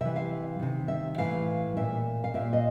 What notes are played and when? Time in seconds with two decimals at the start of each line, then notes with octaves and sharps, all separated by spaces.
0.01 C3 E3 E5
0.16 F5
0.59 C3 D#3
0.88 E5
1.18 A2 E3 F5
1.77 A#2 E5
2.24 F5
2.34 A#2 E5
2.53 D#5